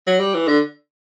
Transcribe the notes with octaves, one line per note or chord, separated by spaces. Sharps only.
F#3
G3
E3
D3